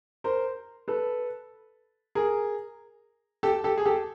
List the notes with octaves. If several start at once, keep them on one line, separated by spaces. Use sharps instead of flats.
A#4 C5
A4 B4
G#4 A#4
G4 A4
G4 A4
G#4
G4 A4